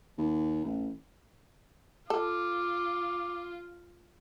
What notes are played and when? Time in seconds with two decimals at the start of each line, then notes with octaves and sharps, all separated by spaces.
0.18 D#2
0.65 A1
2.10 F4 A4 D6